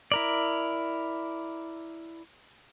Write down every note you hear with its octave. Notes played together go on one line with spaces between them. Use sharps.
E4 A#4 D5